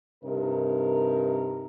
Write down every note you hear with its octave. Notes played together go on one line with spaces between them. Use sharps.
G2 C3 D#4 A#4